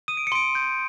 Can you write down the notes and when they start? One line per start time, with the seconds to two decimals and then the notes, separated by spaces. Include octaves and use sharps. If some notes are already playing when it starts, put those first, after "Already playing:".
0.08 D#6 D#7
0.17 D7
0.27 C#7
0.32 C6 D7
0.55 G6